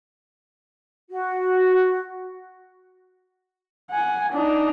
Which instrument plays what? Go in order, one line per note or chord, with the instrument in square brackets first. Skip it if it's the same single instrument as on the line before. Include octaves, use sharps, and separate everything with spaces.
[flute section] F#4
[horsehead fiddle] F#5 G#5
D4 D#4